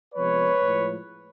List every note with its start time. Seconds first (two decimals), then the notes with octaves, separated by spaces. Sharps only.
0.14 C3 F3 G#3 B3 B4 C#5
0.61 A2 F3 G#3